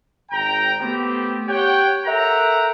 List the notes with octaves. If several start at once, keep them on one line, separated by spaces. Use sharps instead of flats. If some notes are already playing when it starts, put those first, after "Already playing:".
G#1 G5 A#5
A3 B3 C4 G4
G4 C#5 F#5 G5
A4 A#4 E5 F#5 G5 A#5